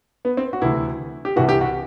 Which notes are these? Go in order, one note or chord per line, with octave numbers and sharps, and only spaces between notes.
B3
C4
F#4
D2 C3 E3 E4
G4
C2 C3 E3 F#4
G4
F#4